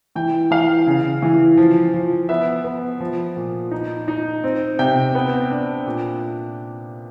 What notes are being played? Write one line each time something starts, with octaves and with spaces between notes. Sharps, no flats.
E3 G5
E3 F5
C#3
E3
F3
F3
B3 E5
B3
F3
A#2
D#4
D#4
C4
C3 G5
B3
D4
A#2